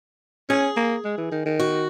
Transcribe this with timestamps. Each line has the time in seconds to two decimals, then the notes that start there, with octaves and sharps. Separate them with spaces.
0.49 C#4 G#4
0.77 A#3
1.04 G#3
1.18 E3
1.32 D#3
1.46 D#3
1.60 F#4